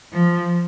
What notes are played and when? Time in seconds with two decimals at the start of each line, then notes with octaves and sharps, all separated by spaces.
0.13 F3